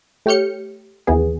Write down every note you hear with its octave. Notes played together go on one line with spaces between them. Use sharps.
A3 G4 C#5 F6 G6 C#7
D#2 E3 B3 G#4